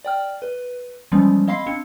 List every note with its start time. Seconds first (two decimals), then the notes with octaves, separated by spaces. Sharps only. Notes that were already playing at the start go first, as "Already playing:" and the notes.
0.05 D5 G5 F6
0.42 B4
1.12 E3 F3 G3 G#3 B3 C#4
1.48 C4 D#5 F5 B5 C6 C7
1.67 C4 D4 C#7